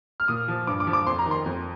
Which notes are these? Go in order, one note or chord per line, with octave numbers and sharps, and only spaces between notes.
F6
A#2 D#6
F3
G2 D6
D6
F3
D6
F2 C6
A#5
D#3
C6
F2